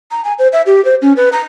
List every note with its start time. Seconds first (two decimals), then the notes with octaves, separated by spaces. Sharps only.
0.11 A#5
0.24 G#5
0.39 C5
0.53 E5
0.66 G4
0.85 C5
1.02 C#4
1.17 B4
1.32 A#5